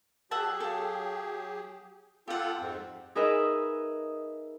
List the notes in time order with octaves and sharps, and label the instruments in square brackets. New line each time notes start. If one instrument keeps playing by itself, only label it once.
[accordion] F#3 G4 G#4 [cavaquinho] E5 F#5 A5
[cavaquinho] A4 F5
[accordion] F4 A4 [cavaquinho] G4 F#5
[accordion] F2 G#2 C4
[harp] D#4 G#4 A#4 B4 D#5 E5